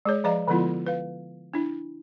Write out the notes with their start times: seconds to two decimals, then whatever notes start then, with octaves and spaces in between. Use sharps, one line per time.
0.05 G#3 G#4 C#5
0.24 F3 G#4 D5 D#5 F5 A#5
0.48 D3 F3 G#3 B3 E4 F4
0.86 B4 F5
1.54 D4 E4